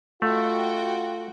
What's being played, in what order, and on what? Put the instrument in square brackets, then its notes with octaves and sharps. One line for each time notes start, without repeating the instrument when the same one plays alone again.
[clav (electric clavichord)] A3 [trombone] F4 [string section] F#4 G5